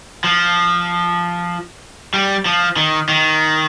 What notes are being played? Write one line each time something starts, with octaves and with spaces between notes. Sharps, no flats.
F3
G3
F3
D#3
D#3